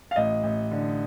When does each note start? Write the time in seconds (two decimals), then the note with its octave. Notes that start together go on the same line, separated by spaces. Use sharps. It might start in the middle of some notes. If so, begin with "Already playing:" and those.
0.11 F5
0.16 A1 D#5
0.44 A1
0.72 D3